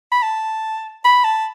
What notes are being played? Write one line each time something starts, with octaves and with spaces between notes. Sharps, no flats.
B5
A5
B5
A5